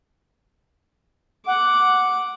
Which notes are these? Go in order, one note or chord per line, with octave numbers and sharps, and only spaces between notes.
F#5 D6